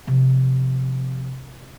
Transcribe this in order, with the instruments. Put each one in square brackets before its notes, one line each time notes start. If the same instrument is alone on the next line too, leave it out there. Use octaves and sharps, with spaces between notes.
[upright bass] C3 F3